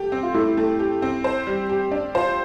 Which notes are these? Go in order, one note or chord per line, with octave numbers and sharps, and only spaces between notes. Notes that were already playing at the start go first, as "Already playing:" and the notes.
Already playing: A3 G4
C4
F4
A3 E4
A3
G4
C4
C5
G3
G4
D4
F4 C5